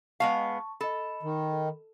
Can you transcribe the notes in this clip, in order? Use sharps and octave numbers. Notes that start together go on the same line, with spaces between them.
G#3 B3 F5 A5 C#6
A4 D#5 B5
D#3